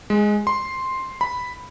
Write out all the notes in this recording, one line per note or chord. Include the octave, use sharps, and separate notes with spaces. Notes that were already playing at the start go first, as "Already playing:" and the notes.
G#3
C6
B5